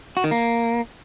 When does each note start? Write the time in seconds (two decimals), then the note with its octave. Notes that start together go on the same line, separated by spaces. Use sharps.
0.17 F#4
0.24 D#3
0.31 A#3